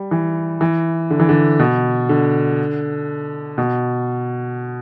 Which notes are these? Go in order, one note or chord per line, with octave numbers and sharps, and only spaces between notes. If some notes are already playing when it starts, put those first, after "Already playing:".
Already playing: G3
E3
E3
D3
E3
D3
B2
D3
B2